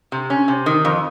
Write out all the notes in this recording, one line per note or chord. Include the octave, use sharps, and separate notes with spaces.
C3
C#4
C3
D#3
F2